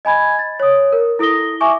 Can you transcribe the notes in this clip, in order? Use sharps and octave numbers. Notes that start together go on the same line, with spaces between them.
D#5 G#5 B5 G#6
A6
C#5 D#6
A#4
E4 A4 D#6 A#6 G7
E5 G#5 C#6 D6